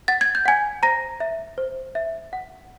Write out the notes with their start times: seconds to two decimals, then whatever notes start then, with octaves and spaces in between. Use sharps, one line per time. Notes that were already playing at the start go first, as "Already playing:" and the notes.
0.08 F#5 A6
0.21 G#6
0.35 G6
0.46 F#5 G#5 G#6
0.83 C5 A#5 A#6
1.20 E5
1.58 C5
1.95 E5
2.33 F#5